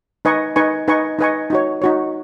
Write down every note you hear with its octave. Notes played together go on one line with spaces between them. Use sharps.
D#4 B4 D#5 G#5 C#6
D#4 B4 D#5 G#5 C#6
D#4 B4 D#5 G#5 C#6
D#4 B4 D#5 G#5 C#6
D#4 F#4 C#5
D#4 F#4 C#5